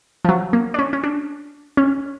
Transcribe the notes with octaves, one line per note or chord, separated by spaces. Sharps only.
F3
F#3
A#3
D4
C#4
C#4
D4
C#4